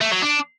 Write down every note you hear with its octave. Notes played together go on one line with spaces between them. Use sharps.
A3
F#3
D4